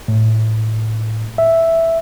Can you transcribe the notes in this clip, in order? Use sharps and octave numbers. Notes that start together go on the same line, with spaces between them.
A2
E5